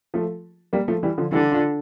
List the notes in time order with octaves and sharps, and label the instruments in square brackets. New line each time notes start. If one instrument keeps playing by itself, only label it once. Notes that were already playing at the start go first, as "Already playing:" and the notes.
[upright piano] F3 A3
G3 A#3
F3 A3
E3 G3
D3 F3
[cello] D3 [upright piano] E3 G3
[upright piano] D4 F4